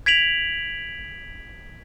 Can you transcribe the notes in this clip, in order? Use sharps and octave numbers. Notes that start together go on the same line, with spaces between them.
G#6 B6 D7 F7 F#7